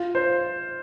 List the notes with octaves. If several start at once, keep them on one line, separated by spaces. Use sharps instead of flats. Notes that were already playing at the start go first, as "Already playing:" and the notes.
Already playing: F4
C5